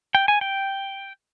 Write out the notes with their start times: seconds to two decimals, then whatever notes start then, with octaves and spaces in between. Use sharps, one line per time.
0.15 G5
0.28 G#5
0.41 G5